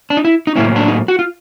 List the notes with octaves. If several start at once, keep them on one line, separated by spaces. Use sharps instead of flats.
D4
D#4
E4
D#4
A2 F#3 A#3 C#4 E4
D4
D#4
F#4
F4